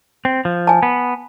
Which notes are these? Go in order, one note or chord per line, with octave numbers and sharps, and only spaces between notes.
C4
F3
G#5 A5
B3